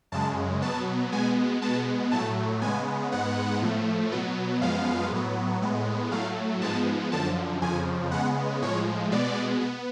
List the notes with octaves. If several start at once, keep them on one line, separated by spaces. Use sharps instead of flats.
F#2 C#3 G#3 A5
B2 F#3 B3 A5
B2 G#3 B3 G#5
B2 G#3 B3 A5
A2 F#3 A3 A5
C#3 G#3 B3 G#5
G#2 G#3 B3 F#5
A2 F3 A3
B2 F#3 B3
F#2 F3 G#3 B3 F5
A2 F#3 B3
A2 G#3 B3
A2 F#3 A3 F5
G#2 F3 G#3 B3 A5
F#2 D3 F3 A5
F2 C#3 F3 G#5
C#3 G#3 B3 F#5
A2 F3 G#3 C#5
B2 G#3 B3 D5
B3